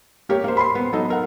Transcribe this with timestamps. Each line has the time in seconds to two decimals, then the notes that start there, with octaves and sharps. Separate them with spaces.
0.29 A#3 G4 A#4 C#5
0.44 A#3 C5
0.57 B5 C6 C7
0.75 B3
0.93 F#3 D#4 A4 D#5
1.10 A#4 F#5